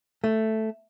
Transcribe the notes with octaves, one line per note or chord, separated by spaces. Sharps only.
A3